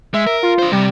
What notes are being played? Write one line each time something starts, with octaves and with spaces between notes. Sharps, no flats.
G#3 E5
A#4
F4
D4 C5
C3 G3